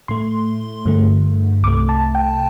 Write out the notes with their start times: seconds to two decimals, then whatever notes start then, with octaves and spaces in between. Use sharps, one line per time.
0.08 A2 A3 C6
0.86 G2 D3 A3
1.63 C2 C3 A3 D6
1.89 A5
2.15 G5